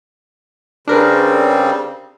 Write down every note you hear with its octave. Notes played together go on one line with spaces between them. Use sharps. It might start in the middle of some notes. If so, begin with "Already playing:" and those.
C#3 G3 C4 D4 A#4 B4